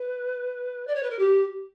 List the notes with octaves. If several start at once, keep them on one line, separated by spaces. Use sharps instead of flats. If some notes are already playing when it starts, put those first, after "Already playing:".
Already playing: B4
D5
C#5
B4
A#4
G4